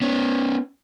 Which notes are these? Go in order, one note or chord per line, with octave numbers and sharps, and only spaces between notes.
B3 C#4